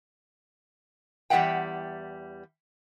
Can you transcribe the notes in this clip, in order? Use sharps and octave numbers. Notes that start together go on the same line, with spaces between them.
E2 G3 G#3 E5 F#5 G5